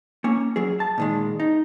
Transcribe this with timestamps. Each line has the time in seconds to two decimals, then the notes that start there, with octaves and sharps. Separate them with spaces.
0.24 A#3 C#4
0.56 F#3 G#4
0.80 A5
0.98 A#2 D#3 G#3
1.40 D#4